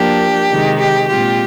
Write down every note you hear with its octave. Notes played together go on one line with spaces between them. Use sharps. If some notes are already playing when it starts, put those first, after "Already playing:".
Already playing: F3 A#3 D4 G4
C3 D#3 G#3 D#4
G4
A#2 G#3 C4 F4 G4